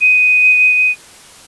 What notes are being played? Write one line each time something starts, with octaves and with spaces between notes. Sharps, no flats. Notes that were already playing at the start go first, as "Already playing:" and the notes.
D#7